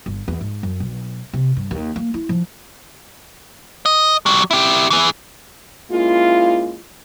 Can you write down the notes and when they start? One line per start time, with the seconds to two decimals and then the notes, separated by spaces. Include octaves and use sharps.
0.06 G1
0.28 E2
0.41 G#2
0.63 F#2
0.80 B1
1.33 C3
1.56 G2
1.71 D#2
1.96 A#3
2.14 E4
2.29 F3
3.86 D#5
4.26 F#3 G4
4.51 E4 G4
4.90 E3 G#4
5.91 G#3 A#3 C#4 E4 F4